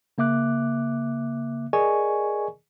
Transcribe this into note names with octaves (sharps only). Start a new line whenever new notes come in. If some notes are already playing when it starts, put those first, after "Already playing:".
C#3 A#3 E5 D6 F#6
G#4 A#4 D5 D#5 G#5 C#6